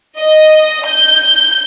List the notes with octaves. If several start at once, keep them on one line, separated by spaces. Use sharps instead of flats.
D#5
G6